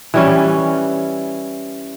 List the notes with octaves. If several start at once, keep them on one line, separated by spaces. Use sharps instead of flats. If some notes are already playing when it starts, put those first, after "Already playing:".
E3 G3 C#4